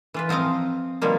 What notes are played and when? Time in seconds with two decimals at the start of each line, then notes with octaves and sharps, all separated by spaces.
0.14 E3 F4 B4
0.29 F3 C4 D#5 F5 A#5
1.02 B2 D#3 F3 G3 A#3